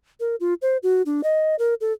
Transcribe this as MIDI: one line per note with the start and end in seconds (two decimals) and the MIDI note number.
0.20 0.36 70
0.40 0.54 65
0.62 0.77 72
0.83 1.02 66
1.06 1.21 62
1.24 1.55 75
1.59 1.74 70
1.81 1.93 69